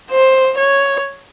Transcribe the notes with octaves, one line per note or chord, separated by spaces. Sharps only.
C5
C#5